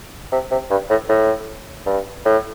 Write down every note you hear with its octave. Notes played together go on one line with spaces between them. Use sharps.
C3
C3
G2
A2
A2
G2
A2